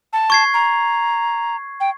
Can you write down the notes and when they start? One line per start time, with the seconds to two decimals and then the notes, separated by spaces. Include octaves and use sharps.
0.13 A5
0.30 C#6 G#6 C7
0.54 A#5
1.80 G5